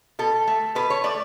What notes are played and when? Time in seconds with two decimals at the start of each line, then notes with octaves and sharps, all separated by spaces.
0.19 B2 A4
0.47 A3
0.75 B2 B4
0.90 C#5
1.04 A3 D5